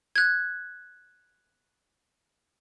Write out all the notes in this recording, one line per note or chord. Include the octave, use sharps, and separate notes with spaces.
F#6 G#6